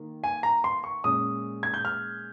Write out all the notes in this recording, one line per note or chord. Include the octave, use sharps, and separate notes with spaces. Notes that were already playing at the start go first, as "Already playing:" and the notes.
Already playing: D#3 A#3
G#5
A#5
C6
C#6
A#2 G#3 C#4 D#6
G#6
G6
F6